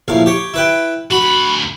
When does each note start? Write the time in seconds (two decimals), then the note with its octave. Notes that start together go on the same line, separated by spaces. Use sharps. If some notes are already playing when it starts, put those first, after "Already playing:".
0.08 A#1 A2 F5
0.26 G4 C#5
0.54 E4 B4 G5
1.11 D2 F#4 B5